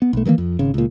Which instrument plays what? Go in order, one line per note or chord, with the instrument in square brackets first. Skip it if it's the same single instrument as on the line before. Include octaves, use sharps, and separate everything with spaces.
[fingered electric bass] B3
B1 A3
D#3 E3 G#3 A#3
F2
G#1 C#3
C#2 A#2